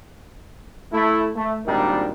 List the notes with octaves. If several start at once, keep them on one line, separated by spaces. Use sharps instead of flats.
A3 E4
A3
G#1 A#2 G3 D4 D#4 A#4